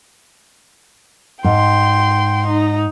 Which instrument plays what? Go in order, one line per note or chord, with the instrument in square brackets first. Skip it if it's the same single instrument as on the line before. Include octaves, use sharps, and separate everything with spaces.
[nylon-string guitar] G#2 [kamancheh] G5 C6
[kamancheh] D#4